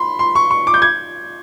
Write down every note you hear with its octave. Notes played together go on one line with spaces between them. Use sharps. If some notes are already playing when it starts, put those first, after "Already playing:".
Already playing: B5 C6
C6
C#6
C#6
D6
G6
G#6